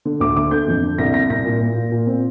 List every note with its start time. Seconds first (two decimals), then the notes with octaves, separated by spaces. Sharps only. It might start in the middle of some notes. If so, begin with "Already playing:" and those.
0.05 D3
0.20 D2 D6
0.36 D3 D6
0.51 D3 G6
0.67 F2
0.83 D3
0.98 C2 A#6
1.14 C3 A#6
1.30 C2 A#6
1.45 A#2
1.61 A#2
1.76 A#2
1.91 A#2
2.07 C4